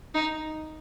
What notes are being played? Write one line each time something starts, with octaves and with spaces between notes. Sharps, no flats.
D#4